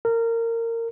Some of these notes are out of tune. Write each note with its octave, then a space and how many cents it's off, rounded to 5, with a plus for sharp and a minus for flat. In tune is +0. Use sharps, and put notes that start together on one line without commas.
A#4 -20